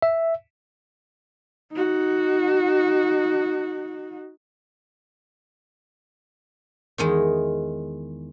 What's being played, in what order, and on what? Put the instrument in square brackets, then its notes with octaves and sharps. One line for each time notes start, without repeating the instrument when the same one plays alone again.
[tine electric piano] E5
[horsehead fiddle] D#4 F#4
[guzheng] E2 D#3 G#3